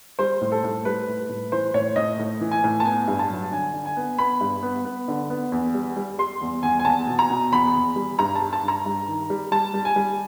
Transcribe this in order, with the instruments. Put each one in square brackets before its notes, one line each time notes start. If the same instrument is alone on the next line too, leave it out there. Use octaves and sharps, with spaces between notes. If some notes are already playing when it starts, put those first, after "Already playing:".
[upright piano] G3 C5
A2
A4
A2
G3 B4
A2
A2
E3 C5
A2 C#5
A2 D#5
A2
E3
G#5
A2
A5
B3 G#5
G2
A5
F#3
D3 G#5
D3
G#5
B3
B3 B5
G2
B3
B3
D3
B3
E2
G3
G3
G3 C6
E2
E2 G#5
G#5
E2 A5
B2
A#5
B2
E2 B5
E2
G3
G2 A#5
A5
G3
A5
G2
A#5
G2
D#3
G3
G3 A5
G3
G#5
G3